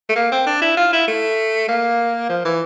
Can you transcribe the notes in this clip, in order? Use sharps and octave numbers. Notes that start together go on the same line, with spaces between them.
A3
A#3
C4
D4
E4
F4
E4
A3
A#3
F3
E3